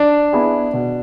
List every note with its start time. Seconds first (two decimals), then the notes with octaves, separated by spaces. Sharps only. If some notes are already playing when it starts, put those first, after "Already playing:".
Already playing: D4
0.33 B3 E4 G#4
0.73 B2